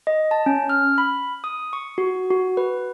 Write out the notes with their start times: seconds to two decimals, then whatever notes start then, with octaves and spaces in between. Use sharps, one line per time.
0.07 D#5
0.31 A5
0.46 C#4
0.69 F6
0.98 B5
1.44 D#6
1.73 C#6
1.98 F#4
2.31 F#4
2.57 B4